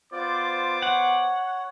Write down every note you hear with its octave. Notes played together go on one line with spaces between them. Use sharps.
B3 F4 C5 D5 D6
C#5 F#5